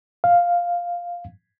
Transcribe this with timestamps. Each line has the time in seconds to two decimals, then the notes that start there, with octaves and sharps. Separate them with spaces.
0.24 F5